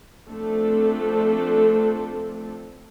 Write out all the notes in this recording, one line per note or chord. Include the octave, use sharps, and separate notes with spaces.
F3 A3 C4 D4 A4